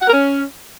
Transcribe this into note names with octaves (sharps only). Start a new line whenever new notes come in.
F#5
A#4
C#4